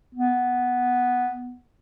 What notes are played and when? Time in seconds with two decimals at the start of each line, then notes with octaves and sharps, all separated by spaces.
0.15 B3